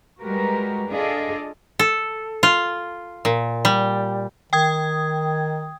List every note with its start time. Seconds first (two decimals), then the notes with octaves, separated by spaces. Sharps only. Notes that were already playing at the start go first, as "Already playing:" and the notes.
0.22 G3 G#3 F#4 G4 A#4 B4
0.90 D4 F4 G#4 A4 D5 D#5
1.79 A4
2.43 F4
3.25 A#2
3.65 G3
4.53 D#3 G5 D#6 G#6